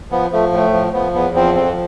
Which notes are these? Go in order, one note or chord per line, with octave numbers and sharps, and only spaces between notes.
F3 B3
F3 A3
A2 A3
F3
F3 B3
E2 B3
F3 C4
F2 C4